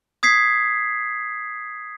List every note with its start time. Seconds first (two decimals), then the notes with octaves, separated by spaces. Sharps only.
0.23 D#6 G#6 B6 C7